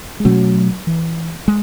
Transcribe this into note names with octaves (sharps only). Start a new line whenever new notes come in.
G#3
B2 F#3 A3 C#4
E3
G#3